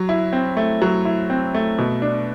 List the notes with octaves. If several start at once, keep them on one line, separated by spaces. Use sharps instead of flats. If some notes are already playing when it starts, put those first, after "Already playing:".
Already playing: F#3
E4
C4
A3
F#3
E4
C4
A3
B2
D4